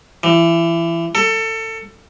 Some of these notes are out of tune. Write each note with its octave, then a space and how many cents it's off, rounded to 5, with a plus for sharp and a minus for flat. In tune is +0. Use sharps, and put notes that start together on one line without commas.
E3 +25
A4 +25